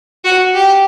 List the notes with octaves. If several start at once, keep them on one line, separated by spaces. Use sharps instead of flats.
F#4
G4